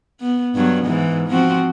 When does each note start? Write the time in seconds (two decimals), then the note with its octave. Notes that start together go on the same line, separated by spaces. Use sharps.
0.21 B3
0.55 G2 F#3 B3
0.86 G#2 E3
1.28 F3 C4 F#4